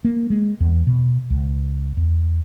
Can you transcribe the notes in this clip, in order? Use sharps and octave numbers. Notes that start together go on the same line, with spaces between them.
A#3
G#3
E2
B2
C#2
E2